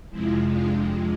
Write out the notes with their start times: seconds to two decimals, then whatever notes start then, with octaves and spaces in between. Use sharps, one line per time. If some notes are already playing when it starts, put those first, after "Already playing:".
0.10 F2 C3 F3 G#3 C4 E4
0.48 D4 F4